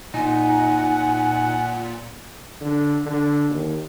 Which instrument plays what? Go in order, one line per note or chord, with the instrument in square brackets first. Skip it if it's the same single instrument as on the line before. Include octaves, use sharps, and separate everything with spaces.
[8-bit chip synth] A#2 [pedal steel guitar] D#4 [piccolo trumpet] F#5 [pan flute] G#5
[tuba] D3
D3
D#2